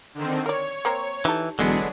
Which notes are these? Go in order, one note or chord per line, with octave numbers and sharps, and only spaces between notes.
D3 D#3 C4
A#4 C#5 D5
A#3 C4 A#4
E3 D#4 G4 A4
E1 D3 F#3 G#3 B3 D4 G#4